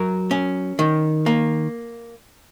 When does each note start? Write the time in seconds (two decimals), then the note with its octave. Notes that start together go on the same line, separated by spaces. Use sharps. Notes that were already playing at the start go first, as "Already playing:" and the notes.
Already playing: F#3 A#4
0.31 C#4
0.79 D#3
1.26 A#3